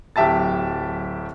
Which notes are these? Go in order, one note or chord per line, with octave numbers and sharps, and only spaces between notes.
D1 F#3 G4 E5 A5 A6